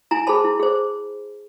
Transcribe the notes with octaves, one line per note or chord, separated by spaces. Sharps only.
E4 G#5 A#5
G#4 C5 A5 B5
E4
G#4 C5